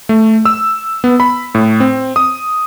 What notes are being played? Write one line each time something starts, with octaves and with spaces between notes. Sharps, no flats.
A3
E6
B3
B5
A2
C4
D#6